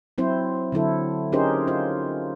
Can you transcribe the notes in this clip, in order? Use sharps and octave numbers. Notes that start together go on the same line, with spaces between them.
F#3 C4 E4 C5
D3 F#3 E4 A4
C#4 D#4 G4 G#4 A#4 C5
F4 C5